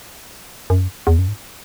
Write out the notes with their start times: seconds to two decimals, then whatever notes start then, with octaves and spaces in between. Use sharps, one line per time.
0.70 F#2
1.07 E2
1.19 F#2
1.28 G#2